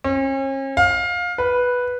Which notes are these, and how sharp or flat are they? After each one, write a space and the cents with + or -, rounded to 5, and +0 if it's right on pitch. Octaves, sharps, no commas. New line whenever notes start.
C#4 -40
F5 +20
B4 -5